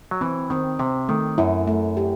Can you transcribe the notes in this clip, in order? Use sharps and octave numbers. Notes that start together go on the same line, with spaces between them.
F#3
E3 C4
D#3 C4
C3 C4
D#3 A3
F#2 E4
A3
G4